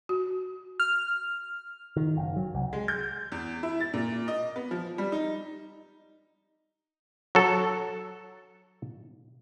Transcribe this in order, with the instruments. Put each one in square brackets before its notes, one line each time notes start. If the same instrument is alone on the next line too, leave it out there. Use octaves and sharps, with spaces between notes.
[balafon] F#4
[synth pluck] F6
[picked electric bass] D#3
F#1
F#3
C2
[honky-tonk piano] G#3
G6
E2
E4
A6
A#2
D#5
B3
F3
G3
D#4
[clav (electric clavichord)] F#3 A4